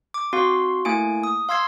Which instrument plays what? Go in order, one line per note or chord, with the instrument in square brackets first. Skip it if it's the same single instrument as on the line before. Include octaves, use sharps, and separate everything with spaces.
[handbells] D6
C4 F#4 F5 C6
A3 A#3 E4 G#5 D7
D#6
F5 C6 E6 G#6 C7